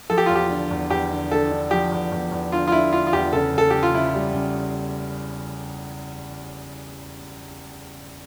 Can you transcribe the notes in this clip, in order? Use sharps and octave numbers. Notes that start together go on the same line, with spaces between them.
F3 A4
G4
E2 F4
G4
D3
E2
E2 G4
D3
D3 A4
D3
F3 G4
E2
E2
E2
D3 F4
F4
D3 E4
D3 F4
F4
E2 G4
C#3 A4
C#3 A4
C#3 G4
F4
C#3 E4
G3
C#3